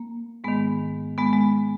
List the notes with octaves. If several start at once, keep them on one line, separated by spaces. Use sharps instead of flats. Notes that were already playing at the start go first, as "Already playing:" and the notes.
Already playing: A#3
G#2 D#3 G#3 B3
G#3 B3
G#3